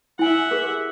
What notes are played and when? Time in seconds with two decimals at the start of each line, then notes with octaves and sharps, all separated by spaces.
0.19 E4 E5 F#5 G#5
0.51 G4 G#4 A#4